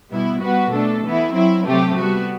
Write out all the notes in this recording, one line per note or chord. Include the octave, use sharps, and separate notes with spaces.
B2 G3 B3 E4
G3 B3 F#4 B4
B2 A3 D4 A4
E3 B3 E4
F#3 C4 E4
C3 F#3 A3 C4 G4
G3 B3 F#4